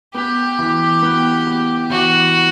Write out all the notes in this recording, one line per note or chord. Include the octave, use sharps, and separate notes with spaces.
B3 G4
E3
B3
B3
E3 F#4